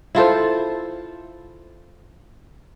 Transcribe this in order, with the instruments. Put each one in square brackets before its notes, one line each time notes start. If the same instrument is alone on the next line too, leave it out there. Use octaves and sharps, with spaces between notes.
[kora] E4 F4 A4 C5